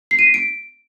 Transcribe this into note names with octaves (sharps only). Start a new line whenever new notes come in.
C7
D#7
B6
D7